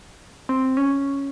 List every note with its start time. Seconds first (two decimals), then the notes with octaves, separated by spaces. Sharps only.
0.49 C4
0.77 C#4